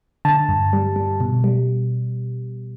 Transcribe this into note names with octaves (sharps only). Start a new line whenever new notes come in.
D3 A5
G2
G3
G3
B2
G3